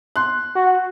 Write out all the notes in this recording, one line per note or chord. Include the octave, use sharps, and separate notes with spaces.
C6 F#6
F#4